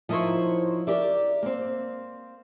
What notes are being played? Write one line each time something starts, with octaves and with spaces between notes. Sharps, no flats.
F3 D#4 E4 A#4 C5 C#5
G4 A#4 D5 E5
A#3 C4